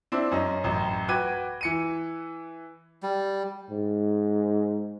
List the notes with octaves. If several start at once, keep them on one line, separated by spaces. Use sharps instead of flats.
C4 D4 E4
F#2 C#4 D#5
A1 F#2
F#4 B4 G5 D6 G#6 D#7
E3 C#7 D#7
G3
G#2